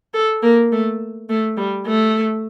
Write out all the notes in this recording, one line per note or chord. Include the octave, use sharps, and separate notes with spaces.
A4
A#3
A3
A3
G3
A3